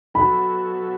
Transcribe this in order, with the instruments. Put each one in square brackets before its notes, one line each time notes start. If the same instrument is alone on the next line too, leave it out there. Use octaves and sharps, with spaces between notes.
[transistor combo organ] F#3 B3 F#4 A4 [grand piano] B5